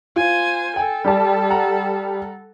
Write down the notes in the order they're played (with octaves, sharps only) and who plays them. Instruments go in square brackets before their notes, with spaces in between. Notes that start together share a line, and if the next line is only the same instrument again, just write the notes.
[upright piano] F4 [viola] C5 G#5
[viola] A4 [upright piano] G5 G#5
[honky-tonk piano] G3 G4 A5
[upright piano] F#5 A#5